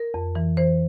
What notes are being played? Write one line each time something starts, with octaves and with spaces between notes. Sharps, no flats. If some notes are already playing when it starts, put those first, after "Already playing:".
Already playing: A#4
F2
E3
E3 C5